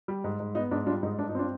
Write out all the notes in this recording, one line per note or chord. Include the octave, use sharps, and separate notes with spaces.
G3
G#2
G#2
B3 D#4
G#2 D4
G3 D4 F4
G#2 D#4
G2 D4
D#4
C4 D4 F4